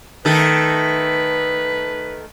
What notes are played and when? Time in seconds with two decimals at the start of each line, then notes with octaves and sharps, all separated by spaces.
0.25 D#3 A3 A4 B4